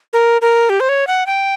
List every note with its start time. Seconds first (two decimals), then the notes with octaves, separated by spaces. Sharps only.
0.13 A#4
0.41 A#4
0.69 G4
0.80 C5
0.89 C#5
1.07 F#5
1.26 G5